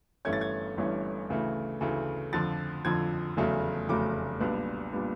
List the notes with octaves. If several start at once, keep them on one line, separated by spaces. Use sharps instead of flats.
G1 G2 E3 A3 C#4 G#6
A6
G#6
G1 G2 E3 A3 C#4
D2 C#3 E3 A3
D2 C#3 E3 A3
F2 D3 F3 A6
F2 D3 F3 G#6
F1 E2 C#3 F#3 A3
F1 E2 C#3 F#3 A3 D6
B1 A#2 G3 B3 D4
A#2 G3 B3 D4